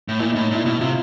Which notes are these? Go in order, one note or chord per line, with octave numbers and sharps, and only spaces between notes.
A2
A#2 E4
D#4
A2
A#2 E4
B2 E4
C3 F4